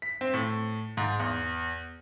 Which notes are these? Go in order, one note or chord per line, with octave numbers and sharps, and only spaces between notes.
B6
C4
A2
G#2
E2